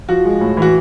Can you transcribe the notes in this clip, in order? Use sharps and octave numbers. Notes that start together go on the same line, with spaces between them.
F3 F#4
G#3
A2
E3 F#4